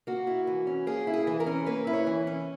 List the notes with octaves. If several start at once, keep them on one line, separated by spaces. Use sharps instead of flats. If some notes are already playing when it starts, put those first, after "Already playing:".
A#3 F#4
E4
E3
C#4
A#3 G#4
E4
G#4
E3
A#4
C#4
A#3 B4
E4
C#5
E3
C#4